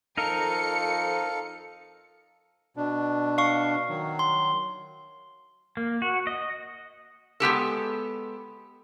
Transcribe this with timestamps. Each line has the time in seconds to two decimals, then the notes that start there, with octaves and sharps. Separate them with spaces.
0.17 F2 D#4 A4 A#4 F5 C#7
2.77 B2 D4
3.38 F5 C#6
3.89 D#3 F#3
4.19 C6
5.77 A#3
6.02 F#4
6.27 D#5
7.40 G#3 B3 G4 A4